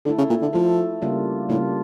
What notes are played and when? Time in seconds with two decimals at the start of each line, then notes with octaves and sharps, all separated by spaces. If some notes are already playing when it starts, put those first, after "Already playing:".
0.05 D3 A3 E4 A4
0.18 C#3
0.30 A#2
0.42 D3
0.53 F3 A3 E4 A4
1.02 C#3 G3 A#3 D4 F4
1.49 A2 C#3 G3 A#3 D4 F4